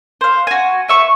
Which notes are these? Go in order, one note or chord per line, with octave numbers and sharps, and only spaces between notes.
C5 F5
F#4 G#5
B4 E5 C#6